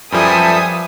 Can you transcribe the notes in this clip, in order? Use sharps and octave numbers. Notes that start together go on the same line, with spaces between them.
F#2 F3 G3 A4 B4 E5 G#5 D#6